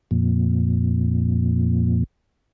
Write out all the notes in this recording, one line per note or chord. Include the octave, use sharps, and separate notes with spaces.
F2 A#2